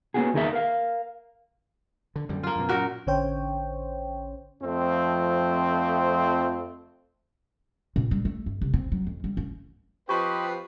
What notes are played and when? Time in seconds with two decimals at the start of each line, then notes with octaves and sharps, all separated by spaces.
0.14 A#3 B3 C#4 F4 F#4 G#4
0.34 E2 D#3 G#4 A#4 B4 E5
0.53 A#4 F5
2.16 D3
2.29 F#2 D3 G3
2.43 A#3 F4
2.56 F#2 B2
2.69 F#2 A#2 F#4 A#4
3.07 A1 D3 C#4 C5 C#5 G5
4.62 F2 F3 A3 C4
7.96 A#2
8.11 G3
8.25 A3
8.46 G1
8.61 C2
8.73 C4
8.92 F#3
9.07 F2
9.24 G3
9.37 C#4
10.09 F3 C4 G4 B4 D#5 G5 B5 C#6